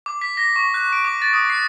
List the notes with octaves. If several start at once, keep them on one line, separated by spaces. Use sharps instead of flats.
D6
B6
A#6
C#6
F#6
D7
D6
A6
D#6
C7